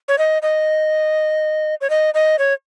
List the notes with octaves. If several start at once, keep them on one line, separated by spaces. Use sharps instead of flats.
C#5
D#5
D#5
C#5
D#5
D#5
C#5